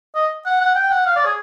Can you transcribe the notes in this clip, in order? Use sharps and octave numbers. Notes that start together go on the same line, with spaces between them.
D#5
F#5
F#5
G5
F#5
F5
D5
G#4